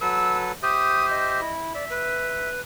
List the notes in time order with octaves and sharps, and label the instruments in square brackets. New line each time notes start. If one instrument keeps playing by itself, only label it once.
[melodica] F#3 A4 B4 [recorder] E6
[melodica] G4 C5 E5 [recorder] D#6
[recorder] D#5
[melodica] E4
[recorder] D5 [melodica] E5
[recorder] B4